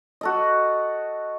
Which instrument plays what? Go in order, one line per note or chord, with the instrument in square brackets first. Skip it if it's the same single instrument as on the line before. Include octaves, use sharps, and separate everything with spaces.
[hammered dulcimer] F#4 A4 D#5